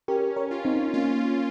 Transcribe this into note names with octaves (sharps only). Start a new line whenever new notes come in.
C#4 G4 A#4
A#4 C#5
F4
C4 D#4
A#3 C#4 F4